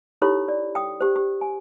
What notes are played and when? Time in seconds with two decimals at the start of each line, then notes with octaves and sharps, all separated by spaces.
0.22 D#4 E4 G4 A4 C#5 B5
0.48 D5
0.75 G5 D#6
1.00 G4 C5
1.16 G4
1.41 G#5